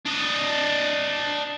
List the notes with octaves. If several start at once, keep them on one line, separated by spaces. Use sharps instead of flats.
D4 D#5